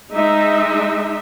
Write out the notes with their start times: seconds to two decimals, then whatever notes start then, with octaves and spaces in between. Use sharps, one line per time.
0.14 G#3 D#4 E5